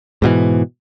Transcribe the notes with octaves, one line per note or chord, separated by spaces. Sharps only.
G#2 B2 D3 E3